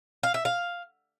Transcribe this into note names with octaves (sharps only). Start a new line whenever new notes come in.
F5
E5
F5